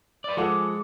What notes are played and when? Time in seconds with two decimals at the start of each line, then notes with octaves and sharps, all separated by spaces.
0.24 B4 D5
0.37 F3 G#3 A4 F#5 D6